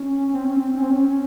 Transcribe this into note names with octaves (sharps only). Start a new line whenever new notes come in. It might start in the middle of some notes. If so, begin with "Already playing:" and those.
Already playing: C#4
C4
C#4
C4
C#4
C4
C#4